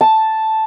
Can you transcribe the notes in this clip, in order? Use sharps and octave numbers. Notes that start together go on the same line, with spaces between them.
A5